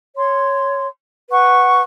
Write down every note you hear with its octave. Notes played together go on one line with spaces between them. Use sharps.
C#5 C6
B4 F#5 C#6